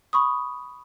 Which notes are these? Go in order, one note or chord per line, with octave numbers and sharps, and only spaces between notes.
B5 C#6 D#6